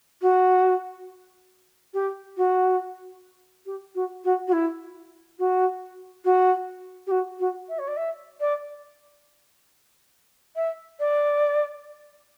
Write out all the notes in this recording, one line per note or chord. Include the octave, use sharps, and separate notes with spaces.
F#4
G4
F#4
G4
F#4
F#4
F#4
E4
F#4
F#4
G4
F#4
F#4
E5
C#5
D5
E5
D5
E5
D5